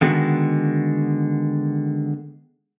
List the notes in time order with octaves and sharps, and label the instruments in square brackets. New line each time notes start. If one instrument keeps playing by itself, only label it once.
[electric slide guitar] D3 D#3 G#3 B3 F#4